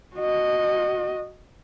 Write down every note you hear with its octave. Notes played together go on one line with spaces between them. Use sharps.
F#4 D#5